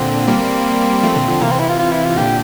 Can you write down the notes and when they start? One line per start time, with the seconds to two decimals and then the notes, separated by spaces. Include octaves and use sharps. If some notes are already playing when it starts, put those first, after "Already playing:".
Already playing: A#2 D3 C4
0.28 G3 A#3
1.03 F3 A3
1.16 A#2 D3
1.29 D3 F3
1.41 C3 E3 A#3
1.51 C4
1.59 E4
1.69 F4
1.79 F4
1.91 E4
2.04 F4
2.16 A#2 D3 G4